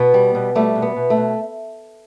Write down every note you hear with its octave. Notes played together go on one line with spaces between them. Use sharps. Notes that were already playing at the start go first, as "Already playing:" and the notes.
Already playing: B2 B3
G3
B2
G3 A3
B2
B3
B2
A3
B2